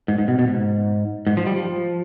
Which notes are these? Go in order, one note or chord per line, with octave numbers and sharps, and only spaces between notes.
G#2
G#2
B2
B2
G#2
G#2
F3
G3
F3